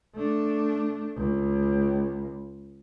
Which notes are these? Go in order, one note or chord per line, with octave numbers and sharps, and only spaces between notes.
A3 D4
C#2